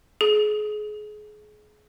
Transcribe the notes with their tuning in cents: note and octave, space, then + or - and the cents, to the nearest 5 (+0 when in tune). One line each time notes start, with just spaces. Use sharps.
G#4 +30